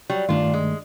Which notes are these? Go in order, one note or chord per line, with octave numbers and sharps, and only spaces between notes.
F#3 G3
G2 D#3 A3 D4 F4
G#3